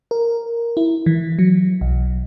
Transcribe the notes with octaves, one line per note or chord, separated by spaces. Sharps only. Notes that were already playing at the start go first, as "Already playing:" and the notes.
A#4
E4
E3
F#3
B1